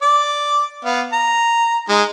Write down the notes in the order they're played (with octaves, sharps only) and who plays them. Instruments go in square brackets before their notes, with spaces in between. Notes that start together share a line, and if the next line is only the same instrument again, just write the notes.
[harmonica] D5 D6
B3 F5
A#5
G#3 D#4